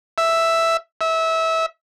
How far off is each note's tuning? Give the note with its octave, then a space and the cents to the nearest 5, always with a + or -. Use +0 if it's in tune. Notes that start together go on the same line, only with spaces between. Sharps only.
E5 +0
E5 -25